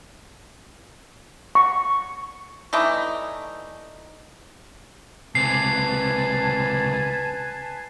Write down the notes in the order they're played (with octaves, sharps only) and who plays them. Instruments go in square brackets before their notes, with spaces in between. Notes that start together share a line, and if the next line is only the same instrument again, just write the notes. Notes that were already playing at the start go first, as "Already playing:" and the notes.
[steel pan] C#6
[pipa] E3 A3 D4 D#4
[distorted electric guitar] C#2 C3 [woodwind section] B4 G#5 A5 [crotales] C7